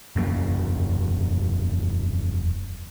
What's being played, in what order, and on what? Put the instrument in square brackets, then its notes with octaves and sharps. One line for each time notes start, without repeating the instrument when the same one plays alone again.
[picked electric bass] E1 F#2 A#3